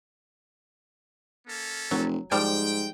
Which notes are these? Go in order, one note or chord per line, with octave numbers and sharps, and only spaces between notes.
A#3 C#4 A4
F1 F#3
G#2 F3 G3 G5